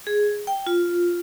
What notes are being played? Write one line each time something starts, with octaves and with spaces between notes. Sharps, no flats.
G#4
G5
F4